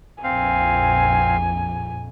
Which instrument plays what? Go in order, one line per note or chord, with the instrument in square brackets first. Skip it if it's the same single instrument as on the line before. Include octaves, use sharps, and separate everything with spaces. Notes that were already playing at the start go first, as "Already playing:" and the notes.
[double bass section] A#1 F2 [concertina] C4 F5 [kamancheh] G#5